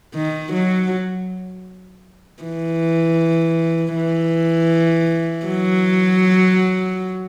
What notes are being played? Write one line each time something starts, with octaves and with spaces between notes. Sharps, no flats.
D#3
F#3
E3
E3
F#3